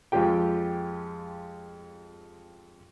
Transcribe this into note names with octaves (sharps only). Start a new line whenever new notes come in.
F2 G#3 F4 G4 G5